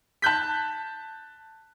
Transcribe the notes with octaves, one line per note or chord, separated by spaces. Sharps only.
A5 F#6 G6 B6